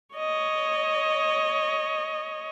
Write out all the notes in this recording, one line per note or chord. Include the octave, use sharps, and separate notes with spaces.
C#5 D#5